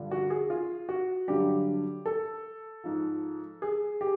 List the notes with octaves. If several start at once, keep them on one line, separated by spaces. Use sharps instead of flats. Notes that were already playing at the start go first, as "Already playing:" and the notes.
Already playing: G2 D3 F3
F#4
G#4
F4
F#4
G2 D3 F#3 G4
A4
G#2 F3
G#4
G4